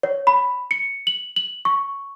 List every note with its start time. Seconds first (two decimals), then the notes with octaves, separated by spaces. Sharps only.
0.03 C#5
0.27 B5
0.71 C#7
1.07 F#7
1.36 F#7
1.65 C#6